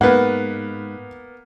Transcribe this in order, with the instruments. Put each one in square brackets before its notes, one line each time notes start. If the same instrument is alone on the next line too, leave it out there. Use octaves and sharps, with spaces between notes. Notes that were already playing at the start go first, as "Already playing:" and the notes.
[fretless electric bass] G#2 [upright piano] A#3 B3 [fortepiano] B4 F#5